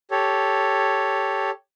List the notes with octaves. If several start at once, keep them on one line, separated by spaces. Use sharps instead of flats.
G4 A4 C#5